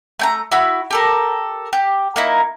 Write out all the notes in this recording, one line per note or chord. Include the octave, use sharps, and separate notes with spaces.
A3 G5 A#5
E4 F#4 B5
G4 A4 A#4
G4
A#3 D#4 E4